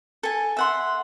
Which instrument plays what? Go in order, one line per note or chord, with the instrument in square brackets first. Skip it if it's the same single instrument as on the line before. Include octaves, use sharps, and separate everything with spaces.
[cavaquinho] A4 G#5
E5 F#5 C6